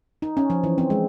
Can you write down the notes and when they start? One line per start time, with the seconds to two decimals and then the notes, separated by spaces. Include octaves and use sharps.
0.22 D#4
0.37 C#4
0.50 F3
0.64 E3
0.78 C4
0.90 G#3